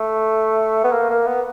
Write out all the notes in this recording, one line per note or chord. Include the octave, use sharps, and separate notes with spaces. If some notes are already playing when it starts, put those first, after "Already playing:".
Already playing: A3
B3
A#3
A#3
B3